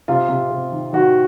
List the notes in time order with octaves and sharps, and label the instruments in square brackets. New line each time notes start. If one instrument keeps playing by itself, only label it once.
[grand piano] C3 F4
C3
C3
D#3
D#3 F#4